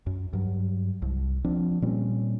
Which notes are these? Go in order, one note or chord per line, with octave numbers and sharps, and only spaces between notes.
F#2
G2 F#3
C2
F3 C4 D4
A#2 G3 C4 C#4